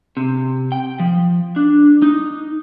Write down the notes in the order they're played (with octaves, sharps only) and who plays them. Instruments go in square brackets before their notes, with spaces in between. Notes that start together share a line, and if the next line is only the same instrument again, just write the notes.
[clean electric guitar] C3
G5
F3
D4
D#4